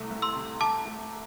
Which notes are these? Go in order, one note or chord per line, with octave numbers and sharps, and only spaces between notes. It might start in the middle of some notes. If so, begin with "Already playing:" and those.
Already playing: C2 C3 A3 E4
C2
C6 E6
C3
C3 A5 D6
A3